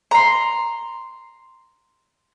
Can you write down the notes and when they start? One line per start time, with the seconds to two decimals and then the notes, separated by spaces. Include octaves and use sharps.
0.11 A#5 C6